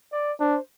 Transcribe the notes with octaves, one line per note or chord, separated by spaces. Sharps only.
D5
D4 C5